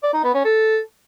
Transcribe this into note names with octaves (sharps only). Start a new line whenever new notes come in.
D5
D#4
B3
C#4
A4